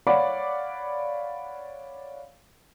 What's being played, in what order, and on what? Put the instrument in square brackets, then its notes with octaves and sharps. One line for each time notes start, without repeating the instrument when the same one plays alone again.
[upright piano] C#5 D5 F5 F#5 B5 D6